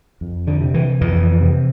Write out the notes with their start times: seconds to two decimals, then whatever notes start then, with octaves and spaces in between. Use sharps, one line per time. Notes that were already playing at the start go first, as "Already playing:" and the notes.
0.21 F2
0.47 D3
0.61 C3
0.74 E3
1.01 F2 E3
1.41 C3